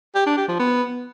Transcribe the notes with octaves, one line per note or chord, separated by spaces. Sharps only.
G4
D4
G4
F3
B3